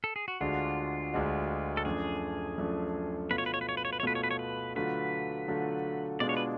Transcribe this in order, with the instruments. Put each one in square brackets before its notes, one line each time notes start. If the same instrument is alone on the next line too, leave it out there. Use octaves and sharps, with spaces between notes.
[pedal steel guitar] A4
G#4
F#4
[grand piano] D2 D3 G#3 D4 F#4 [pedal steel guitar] F4
[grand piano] D2 D3 G#3 D4 F#4
[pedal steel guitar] A4
[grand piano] F#2 F3 A3 D4 [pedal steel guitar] G#4
[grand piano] F#2 F3 A3 D4
[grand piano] B2 A3 F4 [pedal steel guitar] B4
[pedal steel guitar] C#5
B4
C#5
B4
C#5
B4
C#5
B4
C#5
[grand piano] B2 A3 F4 [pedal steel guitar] B4
[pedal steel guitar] C#5
B4
C#5
B4
[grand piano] D3 F#3 A3 F4 [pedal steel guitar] B4
[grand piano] D3 F#3 A3 F4
[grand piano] B2 G#3 D4 F4 [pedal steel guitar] D5
[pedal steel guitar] C#5
B4